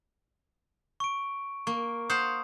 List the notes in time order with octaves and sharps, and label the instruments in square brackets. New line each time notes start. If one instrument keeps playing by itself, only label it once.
[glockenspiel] C#6 D7
[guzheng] A#3 [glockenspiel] C#6
[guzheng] C5 F5 F#5 [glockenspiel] D#6